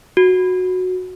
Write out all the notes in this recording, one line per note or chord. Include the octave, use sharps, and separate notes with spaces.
F#4